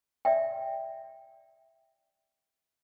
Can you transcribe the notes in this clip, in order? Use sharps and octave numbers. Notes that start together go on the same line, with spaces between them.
D5 E5 G5